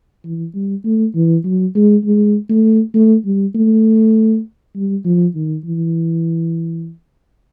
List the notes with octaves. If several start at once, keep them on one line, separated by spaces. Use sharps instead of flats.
E3
G3
A3
E3
F#3
G#3
G#3
A3
A3
G3
A3
G3
F3
D#3
E3